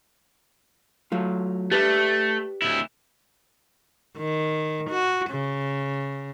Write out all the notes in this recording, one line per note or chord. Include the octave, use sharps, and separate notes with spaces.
F#3 A3 F4
A3 G4 B4 D5
D2 E4
D#3
F#4
C#3